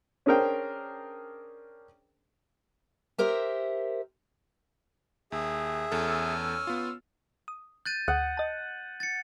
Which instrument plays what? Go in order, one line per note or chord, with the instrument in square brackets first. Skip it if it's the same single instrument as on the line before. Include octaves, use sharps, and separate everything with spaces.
[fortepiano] C#4 D4 G#4 A#4 C5 G5
[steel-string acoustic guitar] G4 A#4 C5 E5
[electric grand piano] D#2 [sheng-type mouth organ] G#4 E5
[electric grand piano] E2 A4 [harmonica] C#4 E6 F6
[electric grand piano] B3 F4
[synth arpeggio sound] D#6
[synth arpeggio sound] F#6 [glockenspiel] G6 A6 D#7
[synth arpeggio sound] D2 D#6 [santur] F#5
[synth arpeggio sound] D#5 A5
[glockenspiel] A6 C#7